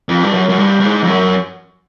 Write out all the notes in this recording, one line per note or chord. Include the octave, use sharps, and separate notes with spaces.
F2
G2
F#2
F#2
G2
G2
G#2
F2
F#2